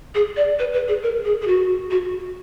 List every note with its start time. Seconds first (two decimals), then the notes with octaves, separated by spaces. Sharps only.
0.15 G#4
0.37 D5
0.59 B4
0.73 B4
0.88 G#4
1.03 A#4
1.25 G#4
1.42 G#4
1.47 F#4
1.91 F#4